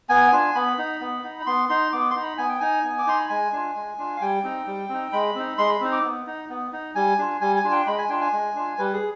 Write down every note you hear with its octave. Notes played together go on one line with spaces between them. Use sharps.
B3 G#5
D4 F4
B3 B5
D#4
B3
D#4
B5
B3 C6
D#4 C6
B3 D6
D#4 C6
B5
B3 G#5
G5
D#4 G#5
B3
D6
D#4 C6
B5
G#3 G#5
D4 F4
G#3
D4 F4
F5
G3 G5
C4 D#4
G3
C4 D#4
G#3 B5
C4 D#4
G#3 C6
B5
C4 D#4
D6
B3
D#4
B3
D#4
G3 G#5
D4 F4
G3 G#5
G#5
D4 F4
G5
G#3 B5
G#5
D4 F4 G5
G#5
G#3
D4 F4
G3 B4
G#4